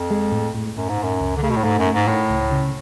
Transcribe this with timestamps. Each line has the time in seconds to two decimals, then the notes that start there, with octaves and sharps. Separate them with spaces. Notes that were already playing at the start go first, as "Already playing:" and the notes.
Already playing: F2
0.11 G#3
0.32 A2
0.55 A2
0.76 F#2 A2
0.89 G#2
0.98 F#2 A2
1.20 C#2
1.36 D3
1.43 C#3 A3
1.50 B2
1.56 A2
1.64 G#2 A3
1.78 F#2
1.87 A3
1.94 G#2
2.08 A2 A3
2.30 C#2
2.52 C#3